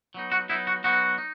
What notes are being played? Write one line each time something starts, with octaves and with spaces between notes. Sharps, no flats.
F#3 B3 D#4
F#4
F#3 B3 D#4 E4
F#4
F#3 B3 D#4 F#4
D#4